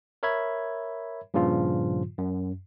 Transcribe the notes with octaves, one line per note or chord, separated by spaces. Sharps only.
A#4 C#5 E5 B5 G#6
G2 A#2 C#3 F3 F4
F#2